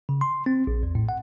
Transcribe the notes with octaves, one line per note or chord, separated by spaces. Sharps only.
C#3
C6
C4
A#1
E2
A2
F#5